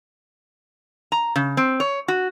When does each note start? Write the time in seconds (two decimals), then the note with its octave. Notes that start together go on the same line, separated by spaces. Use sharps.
1.12 A#5
1.36 C#3
1.57 C4
1.80 C#5
2.08 F#4